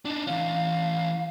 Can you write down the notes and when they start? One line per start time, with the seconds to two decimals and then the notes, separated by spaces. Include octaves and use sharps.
0.05 D4 D#4
0.27 E3 C#4 F5